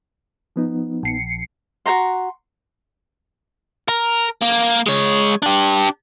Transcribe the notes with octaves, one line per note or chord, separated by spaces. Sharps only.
F3 B3 D#4
A#1 C7 C#7
F#4 C5 A#5 C6
A#4
A#3
G#3 C#5
D4 G4